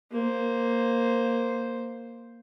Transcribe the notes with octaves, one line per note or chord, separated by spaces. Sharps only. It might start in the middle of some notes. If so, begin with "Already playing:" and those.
A#3 C5